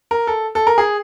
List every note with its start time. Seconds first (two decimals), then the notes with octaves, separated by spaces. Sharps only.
0.11 A#4
0.27 A4
0.55 A4
0.67 A#4
0.78 G#4